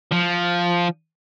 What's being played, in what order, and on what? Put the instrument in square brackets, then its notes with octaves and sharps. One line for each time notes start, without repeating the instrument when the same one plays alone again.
[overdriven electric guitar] F3